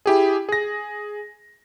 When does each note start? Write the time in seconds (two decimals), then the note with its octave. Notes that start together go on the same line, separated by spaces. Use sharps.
0.06 E4 G4 G#4
0.49 G#4 A#6